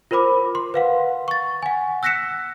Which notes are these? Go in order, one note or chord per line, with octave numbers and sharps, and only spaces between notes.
F4 A#4 C5 B5 D6
C6
B4 F5 F#5
C#6 A6
F#5 G#5
E6 F#6 A#6 B6 C#7 E7